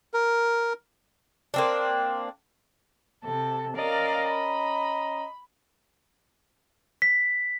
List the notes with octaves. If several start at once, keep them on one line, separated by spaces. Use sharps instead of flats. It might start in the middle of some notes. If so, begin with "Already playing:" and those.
A#4
A#3 C4 D4
C3 A4
C#4 A#4 D5 D#5 F5 A#5
B5
B6